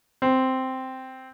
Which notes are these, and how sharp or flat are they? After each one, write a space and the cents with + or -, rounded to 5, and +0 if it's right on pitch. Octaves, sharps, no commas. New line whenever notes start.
C4 -5